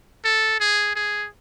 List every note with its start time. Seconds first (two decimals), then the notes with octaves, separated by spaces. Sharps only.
0.25 A4
0.60 G#4
0.95 G#4